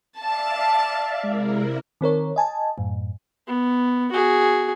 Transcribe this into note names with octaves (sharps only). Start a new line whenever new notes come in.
D5 E5 F5 A5
C3 G#3 E4 A#4
D#3 C4 A#4 C#5
D#5 G#5 A5
F#2 A2
B3
F#4 G#4